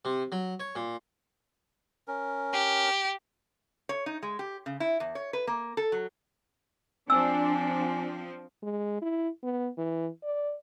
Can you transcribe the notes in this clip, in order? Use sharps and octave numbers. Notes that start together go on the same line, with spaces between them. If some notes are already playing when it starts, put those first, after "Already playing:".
C3
F#3
C#5
A#2
C#4 A#4
G4
C#5
D#4
G#3
G4
C#3
E4
E2
C#5
B4
A#3
A4
F#3
F3 C4 D4 G#5 E6
G#3
E4
B3
E3
D5